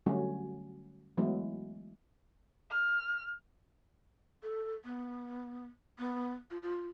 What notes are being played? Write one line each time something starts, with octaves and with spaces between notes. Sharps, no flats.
D3 F#3 G3 A3 C#4 F#4
E3 F#3 G#3 A3 B3 E4
F6
A4
B3
B3
F4
F4